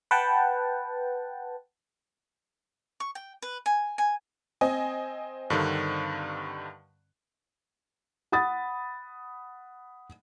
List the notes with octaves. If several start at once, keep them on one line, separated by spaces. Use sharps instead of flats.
B4 F#5 G5 A5
C#6
G5
B4
G#5
G#5
C4 D#5 G#5
G2 D3 D#3
F#5 B5 D#6 A6